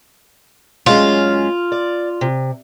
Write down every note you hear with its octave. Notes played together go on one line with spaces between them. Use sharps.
F#2 G#3 C#4 F4
D5
C3